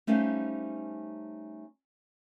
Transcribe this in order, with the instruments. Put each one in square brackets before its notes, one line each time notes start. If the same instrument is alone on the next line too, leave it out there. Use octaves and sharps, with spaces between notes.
[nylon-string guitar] G3 A3 C#4 D#4 C5 F5